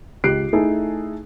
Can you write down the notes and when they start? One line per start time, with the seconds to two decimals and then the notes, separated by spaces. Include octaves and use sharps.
0.24 C#2 G4 F#6 C7 D7
0.53 A3 D#4 E4 G#4 A4